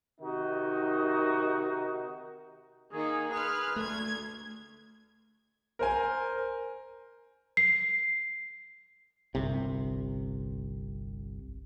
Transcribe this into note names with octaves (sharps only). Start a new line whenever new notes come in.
C3 D#3 D#4 F#4 A#4
D#3 A#3 D#4 G#4
B4 C6 F6
D2 A3 G#6
A#4 C5 G#5
C7
G1 C2 C3